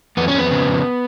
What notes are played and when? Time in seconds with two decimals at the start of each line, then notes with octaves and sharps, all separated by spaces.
0.17 F2 B3
0.28 C#4
0.33 F2
0.38 B3
0.51 C#3
0.67 F2